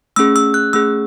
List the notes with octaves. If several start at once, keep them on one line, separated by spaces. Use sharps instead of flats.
A3 C#4 G#4 E6
E6
F#6
A3 C#4 G#4 E6